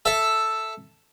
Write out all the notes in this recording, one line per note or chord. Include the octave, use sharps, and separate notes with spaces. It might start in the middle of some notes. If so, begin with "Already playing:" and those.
A4 E5